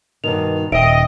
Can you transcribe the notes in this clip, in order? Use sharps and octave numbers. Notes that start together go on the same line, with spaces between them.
G2 B2 D#3 F7
D#1 D#5 E5 G5 D7